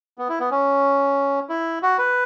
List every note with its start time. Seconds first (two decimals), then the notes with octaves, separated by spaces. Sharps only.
0.18 B3
0.29 E4
0.40 B3
0.51 C#4
1.49 E4
1.83 F#4
1.98 B4